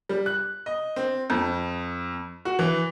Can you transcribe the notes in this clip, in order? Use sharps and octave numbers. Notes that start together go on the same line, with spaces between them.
G3
F#6
D#5
C4
F2
F#4
E3